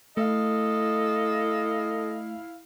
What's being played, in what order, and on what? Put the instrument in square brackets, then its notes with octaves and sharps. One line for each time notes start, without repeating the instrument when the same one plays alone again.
[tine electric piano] A3 [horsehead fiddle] E4 F5 [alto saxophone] A4 [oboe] D#5